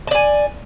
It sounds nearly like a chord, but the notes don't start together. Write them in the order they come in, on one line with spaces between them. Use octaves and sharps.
A5 D5 G#5